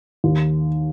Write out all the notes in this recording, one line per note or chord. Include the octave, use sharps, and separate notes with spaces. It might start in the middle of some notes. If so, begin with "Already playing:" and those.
D#2